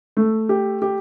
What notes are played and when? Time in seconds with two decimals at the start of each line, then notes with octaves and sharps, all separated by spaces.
0.17 A3
0.49 G4
0.82 G4